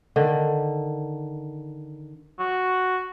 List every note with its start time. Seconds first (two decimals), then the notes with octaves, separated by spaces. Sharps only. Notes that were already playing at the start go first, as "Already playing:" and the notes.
0.16 D3 D#3
2.39 F#4